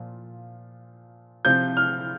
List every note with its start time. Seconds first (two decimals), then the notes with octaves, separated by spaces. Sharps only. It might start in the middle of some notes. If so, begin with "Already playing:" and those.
Already playing: A#2 F3
1.45 C3 F3 G6
1.77 F6